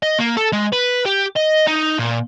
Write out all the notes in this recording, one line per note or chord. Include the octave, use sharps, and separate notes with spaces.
D#5
A#3
A4
G#3
B4
G4
D#5
D#4
A#2